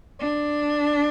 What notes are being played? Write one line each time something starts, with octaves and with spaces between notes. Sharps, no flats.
D4